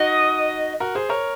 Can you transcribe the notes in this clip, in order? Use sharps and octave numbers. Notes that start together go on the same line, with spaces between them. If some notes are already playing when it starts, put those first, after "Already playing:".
Already playing: D#4 F#4 D#5
F#4 A#4
G#4 C5
A#4 C#5